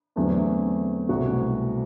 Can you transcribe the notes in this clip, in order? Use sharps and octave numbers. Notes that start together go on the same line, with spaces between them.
E2 D3 F#3 A3 C4
C2 B2 A3 C4 F#4